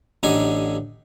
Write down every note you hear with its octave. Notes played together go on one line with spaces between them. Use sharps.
A1 D3 D#4 F#4 G4 G#5